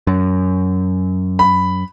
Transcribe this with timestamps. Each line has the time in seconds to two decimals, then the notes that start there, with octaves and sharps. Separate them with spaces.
0.07 F#2
1.39 B5